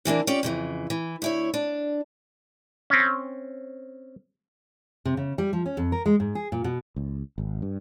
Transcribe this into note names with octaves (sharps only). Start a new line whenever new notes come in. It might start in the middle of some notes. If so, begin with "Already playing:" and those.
C3 E3 A#3 D4
C#4 F4 G4 D5
F2 C#3 E3
E3
D2 E4 C#5
D4
C4 C#4
C3
C#3
G3
F3
C#4
F2
A#4
G#3
G#2
G#4
A#2
B2
C#2
G#1
G2